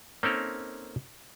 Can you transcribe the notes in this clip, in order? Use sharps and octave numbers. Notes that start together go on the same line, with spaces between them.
A#3 C4 C#4 D#4 A4 A#4